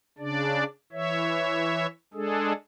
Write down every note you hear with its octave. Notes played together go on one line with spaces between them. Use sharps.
C#3 D4 D5
E3 C#5 E5
G#3 D4 G#4 A4